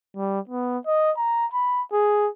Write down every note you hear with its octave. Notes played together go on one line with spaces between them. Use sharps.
G3
B3
D#5
A#5
B5
G#4